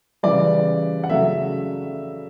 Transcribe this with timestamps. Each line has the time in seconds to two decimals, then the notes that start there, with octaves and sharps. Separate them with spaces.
0.23 C#3 E3 G3 D5
1.04 F#5
1.10 C#3 F#3 A3 E5